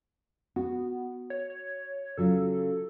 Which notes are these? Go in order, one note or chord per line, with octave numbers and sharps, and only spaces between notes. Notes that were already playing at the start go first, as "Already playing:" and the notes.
B3 F#4
C#5
C#5
C#3 F#3 F4 A4